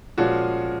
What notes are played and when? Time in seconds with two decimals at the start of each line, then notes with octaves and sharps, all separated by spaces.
0.18 A#2 F3 G#3 C#4 F#4